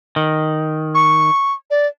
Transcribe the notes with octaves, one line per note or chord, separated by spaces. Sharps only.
D#3
C#6
D5